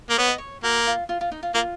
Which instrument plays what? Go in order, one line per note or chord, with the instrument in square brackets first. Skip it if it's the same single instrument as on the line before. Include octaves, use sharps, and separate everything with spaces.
[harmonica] A#3
[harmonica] B3 [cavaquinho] C#5
[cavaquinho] D#5
C#5
[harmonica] A#3 [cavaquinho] F#4
[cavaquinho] F4
F4
F4
D#4
F4
[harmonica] A#3 [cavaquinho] F4